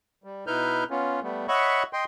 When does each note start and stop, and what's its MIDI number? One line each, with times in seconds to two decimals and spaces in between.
0.24 0.45 55
0.47 0.84 47
0.47 0.84 63
0.47 0.84 64
0.47 0.84 71
0.47 0.84 89
0.47 0.84 91
0.90 1.20 59
0.90 1.20 61
0.90 1.20 65
1.23 1.47 55
1.23 1.47 57
1.23 1.47 59
1.48 1.83 73
1.48 1.83 75
1.48 1.83 76
1.48 1.83 78
1.48 1.83 83
1.48 1.83 85
1.93 2.05 75
1.93 2.05 79
1.93 2.05 84